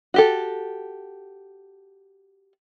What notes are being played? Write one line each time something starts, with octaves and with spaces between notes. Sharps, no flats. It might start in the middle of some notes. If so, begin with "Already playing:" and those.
F#4 G4 A4